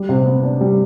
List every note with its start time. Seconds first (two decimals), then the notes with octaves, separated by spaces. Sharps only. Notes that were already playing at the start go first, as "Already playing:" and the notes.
Already playing: G3
0.09 C3
0.26 B3
0.43 D4
0.61 G3